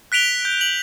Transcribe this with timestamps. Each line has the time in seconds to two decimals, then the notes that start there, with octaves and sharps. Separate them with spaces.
0.12 F#6 B6 D7 F7 G7
0.45 G6
0.61 F#7